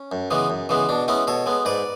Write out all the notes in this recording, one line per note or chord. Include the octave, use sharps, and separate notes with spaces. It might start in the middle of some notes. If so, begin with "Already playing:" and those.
Already playing: C#4
F#2
C#3 E3 G#3 B3
F#2
C#3 E3 G#3 B3
B2 D4
G#3 B3 C#4 E4
B2 A4 C#5
G#3 B3
G#2 B4 D5